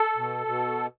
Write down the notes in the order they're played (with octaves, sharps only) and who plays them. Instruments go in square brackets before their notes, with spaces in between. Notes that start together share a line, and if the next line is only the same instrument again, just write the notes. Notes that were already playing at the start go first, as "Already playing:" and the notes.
Already playing: [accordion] A4
B2
B2